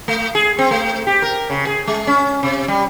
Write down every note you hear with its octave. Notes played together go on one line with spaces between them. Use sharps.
A3
G#4
C4
A3
G4
A#4
C#3
G#4
G#3
C#4
C3
G3